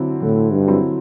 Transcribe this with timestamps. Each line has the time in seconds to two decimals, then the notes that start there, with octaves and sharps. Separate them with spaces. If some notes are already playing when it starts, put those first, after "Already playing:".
Already playing: D3 F#3 C4 E4
0.22 A2 D3
0.52 G2
0.67 F#3 C4 E4